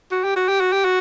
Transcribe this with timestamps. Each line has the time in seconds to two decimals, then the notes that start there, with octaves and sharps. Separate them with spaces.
0.12 F#4
0.24 G4
0.37 F#4
0.49 G4
0.61 F#4
0.73 G4
0.85 F#4